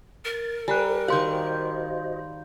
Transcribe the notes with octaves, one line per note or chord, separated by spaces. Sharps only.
A#4 A6
G3 A4 C5 G#5 A#5 F#6
D#3 F#4 G4 C5 D#5 F5 C6 G6